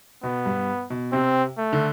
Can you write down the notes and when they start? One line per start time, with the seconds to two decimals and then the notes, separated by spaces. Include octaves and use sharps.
0.23 B2 B3
0.46 G2
0.90 B2
1.12 C3 C4
1.58 A3
1.73 D3